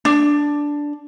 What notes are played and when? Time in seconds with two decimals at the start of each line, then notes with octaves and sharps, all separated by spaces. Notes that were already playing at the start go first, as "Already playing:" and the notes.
0.05 D4